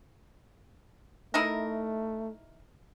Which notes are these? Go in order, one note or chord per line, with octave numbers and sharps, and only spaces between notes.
A3 D#4 E4 A#4